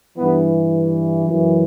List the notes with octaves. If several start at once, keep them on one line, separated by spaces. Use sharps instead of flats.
G2 E3 B3
F#2 E3